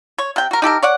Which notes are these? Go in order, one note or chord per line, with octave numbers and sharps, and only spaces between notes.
C#5
C3 G5
F#4 A#4
D#4 G4 A4 A#4
C#5 D5 F#5